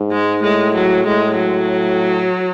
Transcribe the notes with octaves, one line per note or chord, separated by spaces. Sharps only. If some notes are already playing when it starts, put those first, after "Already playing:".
Already playing: G#2
G#3
A2 G#3
F#3
A2 G#3
F#3